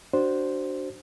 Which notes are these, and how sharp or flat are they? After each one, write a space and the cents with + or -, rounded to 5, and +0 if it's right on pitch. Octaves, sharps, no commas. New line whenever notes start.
D4 +0 F#4 +20 C5 +0